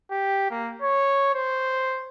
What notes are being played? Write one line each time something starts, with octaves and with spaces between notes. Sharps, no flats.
G4
A#3
C#5
C5